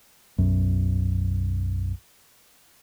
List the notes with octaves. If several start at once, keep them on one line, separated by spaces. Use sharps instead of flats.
B1 F#2